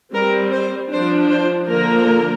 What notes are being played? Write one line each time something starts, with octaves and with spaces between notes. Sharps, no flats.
G3 C4 A#4
C5
F3 D4 C5
C5
D3 F3 A#3 A#4